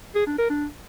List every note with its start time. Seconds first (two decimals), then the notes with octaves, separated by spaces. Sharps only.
0.15 G#4
0.27 D4
0.38 A#4
0.50 D4